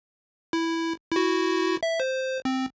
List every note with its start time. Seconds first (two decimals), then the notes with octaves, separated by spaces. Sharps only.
0.53 E4
1.12 E4 F#4
1.83 E5
2.00 C5
2.45 C4